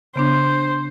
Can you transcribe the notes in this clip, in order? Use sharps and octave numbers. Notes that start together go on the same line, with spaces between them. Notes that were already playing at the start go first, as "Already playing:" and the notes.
C#3 B3 D4 C5